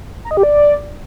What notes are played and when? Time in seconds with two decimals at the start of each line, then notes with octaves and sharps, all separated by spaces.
0.25 A#5
0.31 D#5
0.37 G4
0.43 D5